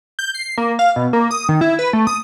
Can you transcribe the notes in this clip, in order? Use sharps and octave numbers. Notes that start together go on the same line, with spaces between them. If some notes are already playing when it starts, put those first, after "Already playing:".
G6
C7
A#3
F5
B2
A#3
D#6
D#3
E4
B4
A3
D#6